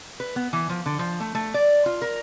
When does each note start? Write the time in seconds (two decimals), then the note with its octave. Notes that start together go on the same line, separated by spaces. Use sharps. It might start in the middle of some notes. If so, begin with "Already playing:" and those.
0.20 B4
0.36 B3
0.53 E3
0.69 F3
0.86 D3
0.99 F3
1.20 A3
1.35 A3
1.54 D5
1.86 F4
2.02 A#4